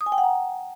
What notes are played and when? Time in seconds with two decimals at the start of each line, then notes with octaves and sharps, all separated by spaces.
0.01 D#6
0.06 G#5
0.12 G5
0.18 F#5
0.24 A#5